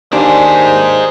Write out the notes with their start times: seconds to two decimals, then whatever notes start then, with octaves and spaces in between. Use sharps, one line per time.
0.12 D#2 D4 D#4 G#4 C5